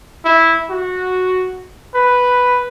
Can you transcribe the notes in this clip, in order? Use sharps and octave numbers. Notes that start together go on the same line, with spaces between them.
E4
F#4
B4